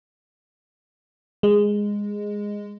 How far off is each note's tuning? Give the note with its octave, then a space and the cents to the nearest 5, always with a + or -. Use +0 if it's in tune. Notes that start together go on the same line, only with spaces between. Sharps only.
G#3 -10